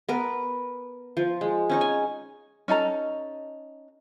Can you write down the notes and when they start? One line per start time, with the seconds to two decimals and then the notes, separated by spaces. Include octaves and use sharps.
0.09 B3 A#4 B4
1.17 F3
1.41 G#3
1.70 C#4 D#4 C#5
1.81 G#5
2.68 C#4 D#4 A4 A#5